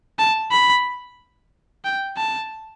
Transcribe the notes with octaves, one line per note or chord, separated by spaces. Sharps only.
A5
B5
G5
A5